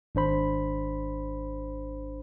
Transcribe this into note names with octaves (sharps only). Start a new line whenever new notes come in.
G#1 D4 C5 B5